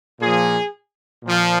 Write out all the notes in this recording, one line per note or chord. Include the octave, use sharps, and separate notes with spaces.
A#2 F3 G#4
A#2 F3